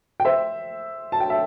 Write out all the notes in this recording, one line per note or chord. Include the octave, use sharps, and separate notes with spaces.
G5
C5 E5
A5
G5
E5 A5